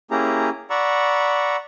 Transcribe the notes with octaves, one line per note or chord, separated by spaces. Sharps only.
A#3 C#4 E4 G4 G#4 A#5
D5 F#5 A#5 B5 C#6 E6